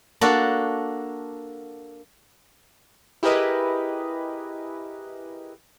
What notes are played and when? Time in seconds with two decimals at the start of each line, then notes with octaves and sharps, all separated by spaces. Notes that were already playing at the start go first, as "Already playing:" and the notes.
0.21 A#3 D4 F#4 A4 F#5
3.23 E4 G4 G#4 A#4 B4 D#5